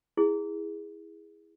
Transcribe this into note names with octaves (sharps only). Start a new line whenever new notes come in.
E4 G#4